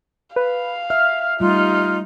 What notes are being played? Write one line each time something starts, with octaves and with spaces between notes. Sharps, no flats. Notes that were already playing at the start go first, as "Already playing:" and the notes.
B4 F5
E5 F6
G3 A3 D#4 F4